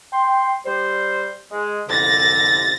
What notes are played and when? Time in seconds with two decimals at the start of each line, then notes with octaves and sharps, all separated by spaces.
0.13 G5 C6
0.66 G3 C5
1.51 G#3
1.89 C2 F2 D3 A6 A#6